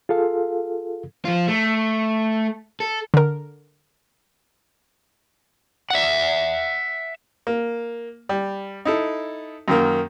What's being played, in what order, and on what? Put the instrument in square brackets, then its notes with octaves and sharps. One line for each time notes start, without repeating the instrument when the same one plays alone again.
[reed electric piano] F4 G#4 A4 F5
[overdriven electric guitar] F3 F4
A3
A4
[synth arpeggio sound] D3 A#4
[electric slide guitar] E5 F#5
[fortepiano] A#3
G3
D#4 E4 A4
F#2 D#3 A#3